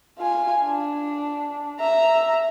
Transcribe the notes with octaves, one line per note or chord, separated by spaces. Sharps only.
F4 G#5
D4
E5 A#5